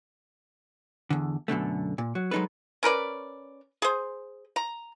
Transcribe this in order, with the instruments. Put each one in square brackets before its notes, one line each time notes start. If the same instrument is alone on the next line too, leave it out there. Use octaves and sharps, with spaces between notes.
[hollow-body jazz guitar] E2 D3
F#2 B2 D3 A3
A#2
F#3
F#3 G#3 D#4 A4 B4
[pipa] C#4 A#4 B4 D5
G#4 C5
A#5